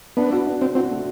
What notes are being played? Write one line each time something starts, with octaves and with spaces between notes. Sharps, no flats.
B3 D4
F#4
D4
C4 D4
C4 F#4
A3